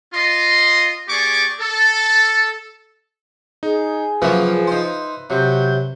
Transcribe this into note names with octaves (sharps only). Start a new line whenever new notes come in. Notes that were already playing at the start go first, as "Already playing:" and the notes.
F4 D#5 C6
A#3 G4 G#4 D5 C#6 D6
A4
D#4 G#4
C#3 F3 F#3 A#3 B4 E5
D#4 C5
C3 F#3 G6